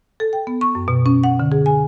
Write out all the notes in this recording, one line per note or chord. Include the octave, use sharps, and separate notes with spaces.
A4
G5
B3
C#6
F#2
B2
C#4
F#5
D3
G#4
G#5